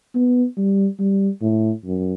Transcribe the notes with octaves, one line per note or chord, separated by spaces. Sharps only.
B3
G3
G3
A2
F#2